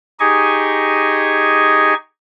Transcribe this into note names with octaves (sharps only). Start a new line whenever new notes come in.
D#4 G4 G#4 D#5 G#5 C#6